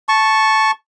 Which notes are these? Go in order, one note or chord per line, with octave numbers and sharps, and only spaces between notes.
A5 C#6